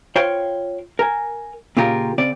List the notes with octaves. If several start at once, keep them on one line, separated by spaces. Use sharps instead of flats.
F4 C5 C#5 F5 G5
A#4 G#5
A#2 C#3 F4 G4 A#4
C#3 C4 D5